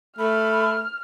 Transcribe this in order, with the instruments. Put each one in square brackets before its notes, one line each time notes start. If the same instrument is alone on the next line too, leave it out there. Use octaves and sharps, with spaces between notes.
[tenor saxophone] A3 [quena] B5 [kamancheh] F6